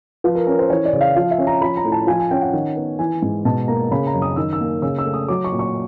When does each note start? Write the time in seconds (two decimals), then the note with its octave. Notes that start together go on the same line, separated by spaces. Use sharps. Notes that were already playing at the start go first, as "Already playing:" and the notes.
0.24 F3 B4
0.35 A#4
0.47 C#4 A#4
0.59 C5
0.70 E3 C#5
0.85 D5
0.93 C#3
1.01 F5
1.16 F3 F5
1.31 E5
1.38 C#4
1.47 A#5
1.61 F3 B5
1.77 A#5
1.85 A2
1.92 A5
2.07 F3 G#5
2.20 G#5
2.31 C#4 G5
2.42 F#5
2.53 D#3
2.77 B3
2.99 E3 G#5
3.22 G#2
3.45 B2 A5
3.68 A#3 A#5
3.91 C#3 B5
4.07 A#5
4.14 F#2
4.22 D#6
4.36 D#3 E6
4.53 E6
4.60 A#3
4.82 C#3 E6
4.99 E6
5.05 A3
5.14 D#6
5.29 F#3 D6
5.44 C#6
5.52 A#2
5.59 C#6